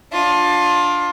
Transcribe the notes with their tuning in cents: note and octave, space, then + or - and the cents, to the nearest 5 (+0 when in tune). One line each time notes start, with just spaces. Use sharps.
D4 +0 F4 +20